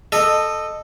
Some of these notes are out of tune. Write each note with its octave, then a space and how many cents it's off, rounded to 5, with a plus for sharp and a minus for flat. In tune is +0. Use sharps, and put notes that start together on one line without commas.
A4 +0 D#5 -15